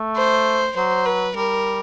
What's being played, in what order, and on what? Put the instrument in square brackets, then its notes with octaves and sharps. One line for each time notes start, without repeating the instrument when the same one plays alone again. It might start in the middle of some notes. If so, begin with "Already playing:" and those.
Already playing: [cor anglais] A3
[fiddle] C5
[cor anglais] F#3 [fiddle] C5
[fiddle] B4
[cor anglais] G3 [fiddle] A#4